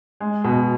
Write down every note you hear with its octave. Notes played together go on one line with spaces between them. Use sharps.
G#3
B2